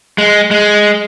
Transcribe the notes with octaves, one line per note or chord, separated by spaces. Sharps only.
G#3
G#3